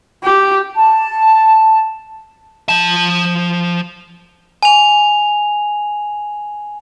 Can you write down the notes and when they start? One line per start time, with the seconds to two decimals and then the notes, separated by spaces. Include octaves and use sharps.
0.24 G4
0.77 A5
2.69 F3 A5
4.63 G#5 F7